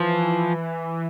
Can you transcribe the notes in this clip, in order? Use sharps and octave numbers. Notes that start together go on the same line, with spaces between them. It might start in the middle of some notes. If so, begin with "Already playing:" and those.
Already playing: E3 F3